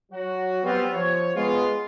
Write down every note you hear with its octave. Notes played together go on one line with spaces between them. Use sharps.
F#3 F#4
G3 B3 C4 F4
F3 C#5
G#3 B3 F4